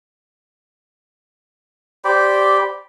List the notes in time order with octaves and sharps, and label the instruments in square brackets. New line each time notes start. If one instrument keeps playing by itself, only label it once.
[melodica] G4 C5 D5 B5